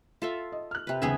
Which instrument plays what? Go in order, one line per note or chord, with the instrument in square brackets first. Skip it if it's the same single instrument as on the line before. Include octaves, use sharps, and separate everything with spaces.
[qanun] F4 A4 E5
[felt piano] D#5
F6 F#6
[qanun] C3 B4
[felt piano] F#1 D#2 C#3 [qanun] B3 G#4 E5